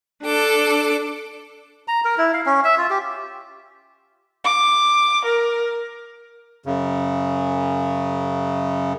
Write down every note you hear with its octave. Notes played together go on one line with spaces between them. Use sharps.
D4 A4 D6
A#5
A#4
E4
F5
C#4
E5
F4
G4
D6
A#4
F#2 C#3